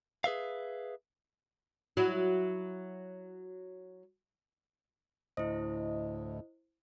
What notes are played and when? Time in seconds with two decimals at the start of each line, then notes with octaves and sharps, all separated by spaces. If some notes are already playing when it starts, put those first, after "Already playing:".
0.24 G#4 B4 E5 F5
1.97 F#3 E4
5.37 D2 A2 E4 C5 D#5